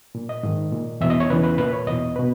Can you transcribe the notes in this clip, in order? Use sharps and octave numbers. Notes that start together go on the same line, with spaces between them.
A#2
D#5
G#2 D#3
A#2
E2 B2 E5
D#5
C#5
E2 C#3 E3 B4
B4
A#2 B4
C#5
E2 B2 D#5
B2 B4